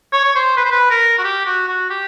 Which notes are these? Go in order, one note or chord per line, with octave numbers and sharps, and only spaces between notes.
C#5
C#5
C5
B4
C5
B4
A#4
F#4
G4
F#4
F#4
G4